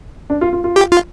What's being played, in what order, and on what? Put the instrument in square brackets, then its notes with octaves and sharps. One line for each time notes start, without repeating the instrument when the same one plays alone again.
[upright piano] D4
F4
F4
F4
[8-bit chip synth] G4
F4